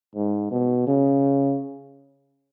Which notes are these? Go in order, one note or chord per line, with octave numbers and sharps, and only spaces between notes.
G#2
B2
C#3